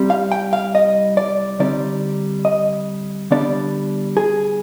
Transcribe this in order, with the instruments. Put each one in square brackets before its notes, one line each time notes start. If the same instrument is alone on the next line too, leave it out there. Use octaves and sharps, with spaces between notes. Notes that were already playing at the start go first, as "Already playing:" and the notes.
Already playing: [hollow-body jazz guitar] C2 C3 G3
F5
G5
F5
D#5
D5
D3 G3 C4 D#4 D5
D#5
D3 G3 B3 D4 D5
G#4